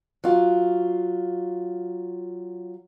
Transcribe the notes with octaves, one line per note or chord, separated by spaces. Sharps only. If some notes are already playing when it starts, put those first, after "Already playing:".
F#3 F4